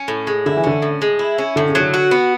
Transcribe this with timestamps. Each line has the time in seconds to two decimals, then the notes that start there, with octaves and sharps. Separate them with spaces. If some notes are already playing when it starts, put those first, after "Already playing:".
Already playing: C#4
0.08 A2
0.27 G#3
0.46 D3 E4
0.57 E3
0.64 D3 C#4
0.82 A2
1.02 G#3
1.19 E4
1.38 C#4
1.56 A2 D3
1.69 C#3
1.75 F#3
1.80 D3
1.94 F#4
2.11 B3